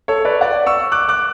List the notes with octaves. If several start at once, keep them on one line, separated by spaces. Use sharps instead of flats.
A4 C#5
B4 D5
D5 F#5
C#6 E6
D6 F#6
D6 F#6